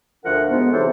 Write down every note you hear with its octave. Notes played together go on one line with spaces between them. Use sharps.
D2 F3 A3 D4 A#4 F#5
G#2 B3
C3 E3 F#3 D#4 A4 C5